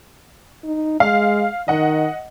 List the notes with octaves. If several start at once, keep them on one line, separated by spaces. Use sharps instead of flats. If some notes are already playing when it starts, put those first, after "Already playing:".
D#4
G#3 F5
D#3 D#5 F#5